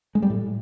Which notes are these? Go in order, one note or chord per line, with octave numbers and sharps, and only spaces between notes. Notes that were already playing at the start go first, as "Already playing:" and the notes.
G#3
G3
A2